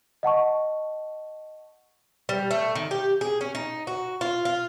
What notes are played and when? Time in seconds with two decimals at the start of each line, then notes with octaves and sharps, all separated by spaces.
0.23 D#5 F#5 A5 C#6
2.29 G3
2.51 A3
2.75 D#3
2.91 G4
3.21 G#4
3.41 C#4
3.55 D#4
3.87 F#4
4.21 F4
4.45 F4